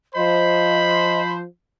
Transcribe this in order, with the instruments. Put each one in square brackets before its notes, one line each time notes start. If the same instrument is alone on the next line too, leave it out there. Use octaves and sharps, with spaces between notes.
[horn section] F3 C5 [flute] D#5 [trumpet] B5